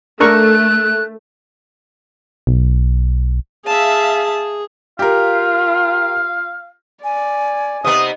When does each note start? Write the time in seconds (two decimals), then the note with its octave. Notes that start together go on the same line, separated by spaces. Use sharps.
0.20 A3 D4 A#4 C#6 F#6
2.47 B1
3.66 G#4 E5 F5 A5
4.99 F4 G4 A#4 F5
7.04 D5 G#5
7.84 C3 B3 D#4 D#6